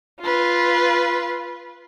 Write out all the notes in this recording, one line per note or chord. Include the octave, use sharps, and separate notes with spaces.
F4 B4